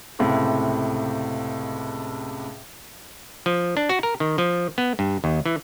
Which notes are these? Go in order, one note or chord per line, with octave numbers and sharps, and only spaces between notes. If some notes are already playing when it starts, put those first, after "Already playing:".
C#2 A2 C3
F3
D4
F#4
A#4
D#3
F3
B3
G2
D#2
E3